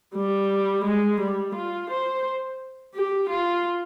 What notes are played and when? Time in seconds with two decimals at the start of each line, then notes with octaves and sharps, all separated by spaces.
0.15 G3
0.85 G#3
1.21 G3
1.55 F4
1.90 C5
2.95 G4
3.30 F4